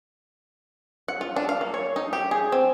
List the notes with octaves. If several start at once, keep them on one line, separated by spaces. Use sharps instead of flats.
F#5
F4
D4
F5
A#3
C#5
D#4
G4
G#4
C4